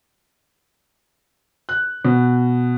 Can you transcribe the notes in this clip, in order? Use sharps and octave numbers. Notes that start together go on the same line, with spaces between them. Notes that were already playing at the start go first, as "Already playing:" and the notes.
F#6
B2